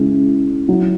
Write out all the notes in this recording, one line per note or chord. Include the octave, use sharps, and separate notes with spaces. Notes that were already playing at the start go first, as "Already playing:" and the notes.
Already playing: C#3 G#3 C#4 E4
F#3 E4